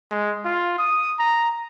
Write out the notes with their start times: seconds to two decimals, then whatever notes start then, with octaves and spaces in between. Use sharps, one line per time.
0.11 G#3
0.45 F4
0.79 D#6
1.19 A#5